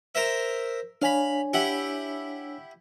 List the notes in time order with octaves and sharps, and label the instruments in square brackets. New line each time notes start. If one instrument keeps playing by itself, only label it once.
[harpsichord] A#4 C5 E5
[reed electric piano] D4 C#5 G#5 [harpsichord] F5 B5
[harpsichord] E4 G4 F#5